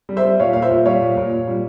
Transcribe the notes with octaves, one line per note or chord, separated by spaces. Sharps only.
G3
C5 E5
G3
A#2 C#5 F5
A#2 F5
C5 E5
A#2
G3 C#5 F5
A#2
A#2
A#2
G3